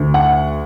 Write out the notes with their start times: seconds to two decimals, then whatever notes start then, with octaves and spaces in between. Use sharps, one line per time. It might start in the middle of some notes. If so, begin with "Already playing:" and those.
Already playing: D2
0.14 F#5